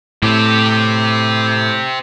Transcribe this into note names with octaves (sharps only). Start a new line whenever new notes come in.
A2 C4 G4